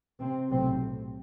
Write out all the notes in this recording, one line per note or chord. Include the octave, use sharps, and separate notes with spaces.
C3 C4
B1 A2 C3 C4